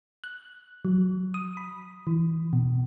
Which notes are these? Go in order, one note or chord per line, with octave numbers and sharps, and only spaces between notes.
F#6
F#3
D#6
B5
E3
B2